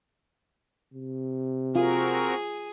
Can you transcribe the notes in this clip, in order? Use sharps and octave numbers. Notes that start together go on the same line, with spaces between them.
C3
C4 F4 F#4 G#4 A#4